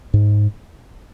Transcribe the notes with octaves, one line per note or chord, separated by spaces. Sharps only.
G#2